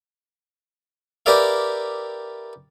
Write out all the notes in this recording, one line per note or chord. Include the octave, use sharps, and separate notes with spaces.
G4 A#4 B4 D5 E5 F5